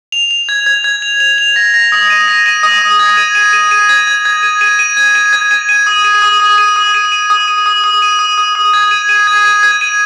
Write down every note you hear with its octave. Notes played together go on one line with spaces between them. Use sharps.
F7
F7
G#6
G#6
G#6
F7
F7
F7
A#6
A#6
D#6
D#7
A#6
D#7
D#6
D#6
G#6
D#7
D#7
D#7
D#7
G#6
G#6
G#6
D#7
D#7
D#7
G#6
D#7
G#6
D#7
D#7
D#6
D#7
D#6
D#6
D#7
D#6
D#7
D#7
D#6
D#7
D#6
D#6
D#7
D#6
D#6
D#6
G#6
D#7
D#7
G#6
D#7
G#6
D#7